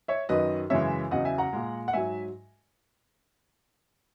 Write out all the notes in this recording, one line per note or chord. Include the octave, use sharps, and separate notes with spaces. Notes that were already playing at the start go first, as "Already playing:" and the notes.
C#5 E5
F#2 D#3 F#3 B4 D#5
F#2 C#3 E3 G#3 C#5 E5
E2 C#3 F#3 D#5 F#5
E5 G#5
F#5 A#5
A#2 G#3
F#5
G#2 F#3 E5 G#5